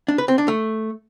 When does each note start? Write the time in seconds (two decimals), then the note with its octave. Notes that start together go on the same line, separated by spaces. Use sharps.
0.08 D4
0.18 B4
0.28 C4
0.38 D4
0.48 A3